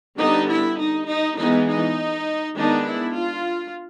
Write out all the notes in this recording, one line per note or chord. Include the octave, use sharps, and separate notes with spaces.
D3 G3 B3 D4 D#4
E4
D#4
D#4
E3 G#3 B3 D#4
D#4
D#3 G#3 B3 D4 D#4
E4
F4